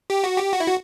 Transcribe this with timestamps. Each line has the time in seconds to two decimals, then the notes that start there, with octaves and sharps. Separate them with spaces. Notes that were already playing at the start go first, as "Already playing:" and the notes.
0.10 G4
0.24 F#4
0.38 G4
0.53 F#4
0.60 E4
0.68 F#4